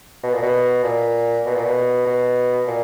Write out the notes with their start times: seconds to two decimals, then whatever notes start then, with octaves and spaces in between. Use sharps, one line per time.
0.23 B2
0.33 A#2
0.42 B2
0.84 A#2
1.46 B2
1.55 A#2
1.65 B2
2.07 B2
2.67 A#2